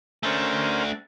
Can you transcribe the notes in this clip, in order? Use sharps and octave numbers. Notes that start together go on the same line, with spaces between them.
A3 C#4 D4 A#4 C5